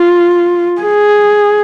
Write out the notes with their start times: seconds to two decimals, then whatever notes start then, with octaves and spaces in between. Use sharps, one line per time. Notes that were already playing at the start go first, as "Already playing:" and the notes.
Already playing: F4
0.82 G#4